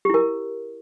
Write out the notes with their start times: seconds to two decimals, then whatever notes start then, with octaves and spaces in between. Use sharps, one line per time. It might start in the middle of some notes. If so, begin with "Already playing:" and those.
0.05 G4
0.10 E4
0.14 A#4